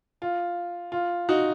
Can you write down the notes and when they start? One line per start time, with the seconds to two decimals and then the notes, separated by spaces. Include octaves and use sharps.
0.22 F4
0.92 F4
1.29 D#4 F#4